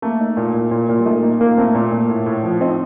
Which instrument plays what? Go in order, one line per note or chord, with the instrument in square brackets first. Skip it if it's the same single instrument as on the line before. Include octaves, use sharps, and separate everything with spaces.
[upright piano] A3 [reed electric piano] A#3
[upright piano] D#4
A#2
A#2
A#2
A#2
[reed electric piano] G3
[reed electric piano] A3 [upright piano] D#4
[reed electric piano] A#3 [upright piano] D#4
[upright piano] A#2 [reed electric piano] A#3
[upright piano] A3 [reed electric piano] C4
[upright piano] A#2
A#2
A2
A2
F3
[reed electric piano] C4 [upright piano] D#4